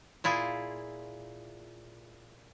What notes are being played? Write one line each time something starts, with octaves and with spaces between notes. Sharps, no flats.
A#2 E4 F4 G#4